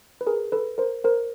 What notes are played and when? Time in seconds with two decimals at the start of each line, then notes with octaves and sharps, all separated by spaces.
0.21 B4
0.27 G#4 A#4
0.52 A4 B4
0.78 A#4 C5
1.04 A#4 C5